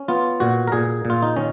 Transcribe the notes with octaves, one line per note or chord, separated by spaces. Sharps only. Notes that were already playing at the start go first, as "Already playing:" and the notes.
Already playing: C#4
B3 F4
A#2 F#4
A#4
A#2 G#4
A#2
F4
D#4
D#3 C#4